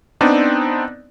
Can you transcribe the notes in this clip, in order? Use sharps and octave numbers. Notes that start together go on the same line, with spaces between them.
B3 C4 D4 D#4 D5